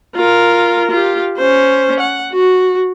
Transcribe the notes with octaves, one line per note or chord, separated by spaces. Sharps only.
F4 A#4
F4 G4
C#4 C5
F#5
F#4